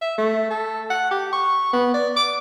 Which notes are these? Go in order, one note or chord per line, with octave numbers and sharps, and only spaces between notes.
E5
A3
A4
F#5
G4
C#6
B3
D5
D6